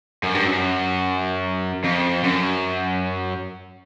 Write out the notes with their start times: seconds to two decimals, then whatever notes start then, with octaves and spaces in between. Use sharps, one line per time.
0.23 F#2
0.34 G2
0.46 F#2
1.84 F2
2.24 F#2